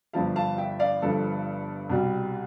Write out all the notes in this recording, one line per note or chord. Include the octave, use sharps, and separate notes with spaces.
G1 G2 F3 F5 A5
F5 A5
E5 G5
D5 F5
G1 G2 F3 A4
C2 B2 G3